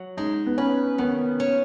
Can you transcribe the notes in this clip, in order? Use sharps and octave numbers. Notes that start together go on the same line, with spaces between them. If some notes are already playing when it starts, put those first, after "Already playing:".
Already playing: F#3
G#3 D#4
B3
C#4 B4
D#3 B3
C#4